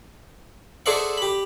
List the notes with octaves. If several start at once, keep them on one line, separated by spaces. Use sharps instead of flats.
G#4 A4 C5 D5 E5 F#5
G4 B5